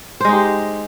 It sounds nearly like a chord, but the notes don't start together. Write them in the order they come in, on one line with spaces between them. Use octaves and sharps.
C5 G#3 D#4 G4